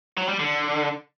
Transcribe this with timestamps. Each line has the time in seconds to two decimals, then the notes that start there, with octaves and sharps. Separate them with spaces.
0.18 F#3
0.29 G3
0.39 D3